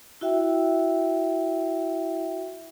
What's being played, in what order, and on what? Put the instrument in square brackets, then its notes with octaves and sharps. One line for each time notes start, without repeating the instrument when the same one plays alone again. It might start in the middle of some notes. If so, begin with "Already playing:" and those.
[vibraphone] E4 F#4 E5 G5